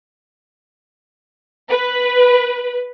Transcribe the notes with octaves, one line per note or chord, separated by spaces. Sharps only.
B4